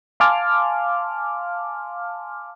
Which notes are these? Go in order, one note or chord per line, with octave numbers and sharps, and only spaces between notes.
F5 G#5 A5 C6 D6 F6